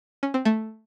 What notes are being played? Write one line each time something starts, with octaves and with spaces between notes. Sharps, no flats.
C#4
C4
A3